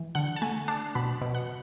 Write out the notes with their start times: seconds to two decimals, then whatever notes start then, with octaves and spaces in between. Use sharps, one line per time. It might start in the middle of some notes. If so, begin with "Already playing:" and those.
Already playing: E3
0.15 D3 F#5
0.36 A5
0.42 A3 G#5
0.68 D4 A5
0.95 B2 B5
1.21 B2
1.35 F#5